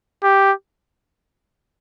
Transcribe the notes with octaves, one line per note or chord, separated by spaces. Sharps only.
G4